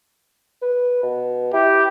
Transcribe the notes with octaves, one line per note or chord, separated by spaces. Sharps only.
B4
B2
E4 G4